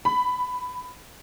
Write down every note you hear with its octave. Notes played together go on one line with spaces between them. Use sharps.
B5